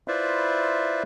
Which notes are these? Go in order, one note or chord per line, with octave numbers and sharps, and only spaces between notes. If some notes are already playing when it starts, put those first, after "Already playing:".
E4 F4 B4 C5 D5 E5